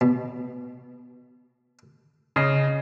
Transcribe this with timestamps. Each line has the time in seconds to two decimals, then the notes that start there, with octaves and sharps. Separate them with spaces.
0.01 B2
2.36 C#3 D#5 C7